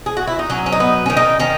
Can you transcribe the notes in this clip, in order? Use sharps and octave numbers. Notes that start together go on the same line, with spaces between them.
G#4
F#4
E4
D#4
F#3 C#4
C#4
D#4
B3
D#3 C#4
D#4
D#3 C#4